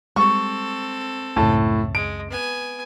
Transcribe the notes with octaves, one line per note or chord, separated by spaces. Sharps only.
G3 G#3 C4 A4 C#6
C#2 F#2 A2 C#3 A5
G#3 D7
B3 G#5